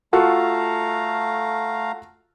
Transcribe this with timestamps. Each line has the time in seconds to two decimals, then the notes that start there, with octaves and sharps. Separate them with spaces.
0.13 A3 F4 F#4 A4 F5 A#5